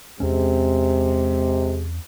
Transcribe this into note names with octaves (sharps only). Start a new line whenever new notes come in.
E2 C3 G#3 C4 C#4